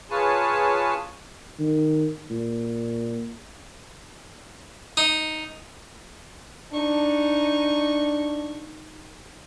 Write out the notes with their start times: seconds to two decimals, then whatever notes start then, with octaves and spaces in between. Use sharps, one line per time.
0.10 F4 G#4 B4 C#5 G#5 A5
1.59 D#3
2.30 A#2
4.97 D#4
6.73 D4 D#4 C#6